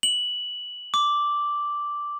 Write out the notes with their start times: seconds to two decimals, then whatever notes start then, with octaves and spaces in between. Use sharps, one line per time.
0.03 F#7
0.94 D6